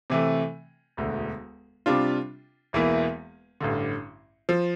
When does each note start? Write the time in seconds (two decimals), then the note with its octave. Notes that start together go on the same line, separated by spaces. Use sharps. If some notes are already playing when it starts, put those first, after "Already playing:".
0.10 C3 E3 A3
0.97 E1 D2 D3
1.86 C3 G3 D4 F4
2.73 E1 E2 E3 A#3 E4
3.61 A1 G2 D3
4.49 F3